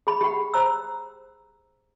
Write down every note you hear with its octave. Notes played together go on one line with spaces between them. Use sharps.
G#4 B5
G4 F#5
C5 A#5 E6